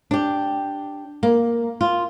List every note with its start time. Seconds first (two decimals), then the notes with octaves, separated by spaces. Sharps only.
0.11 D4 G4
1.23 A#3
1.81 F4